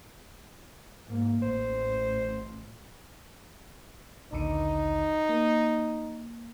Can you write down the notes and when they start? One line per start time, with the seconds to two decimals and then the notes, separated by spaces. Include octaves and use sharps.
1.08 G#2 A#3
1.42 A1 C5
4.33 A#1 D#2 D3 D#4
5.29 A#3